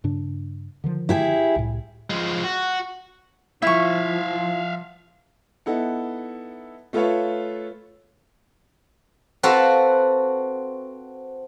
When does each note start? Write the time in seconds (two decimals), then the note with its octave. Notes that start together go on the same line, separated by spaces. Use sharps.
0.04 G2 C#3 D4
0.84 D3 D#3 F3
1.09 E4 G4 G#4
1.56 C2 A2
2.10 F3 G#3
2.44 F#4
3.62 F3 E4 E5 F5 C#6
5.66 B3 D#4 E4 A4 F#5
6.93 A3 F4 A4 B4 C#5 F5
9.43 C4 F#4 A4 B4 F5 A5